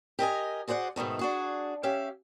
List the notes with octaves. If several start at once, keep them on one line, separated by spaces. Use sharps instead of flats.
G4 A#4 D#5 G#5
F#4 G#4 C5 D5 F#5
G#2 B2 D#3 A3
D4 F#4 G#4
C#4 G4 E5 F5